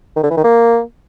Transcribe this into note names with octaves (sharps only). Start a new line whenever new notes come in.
D#3
D3
E3
D#3
A#3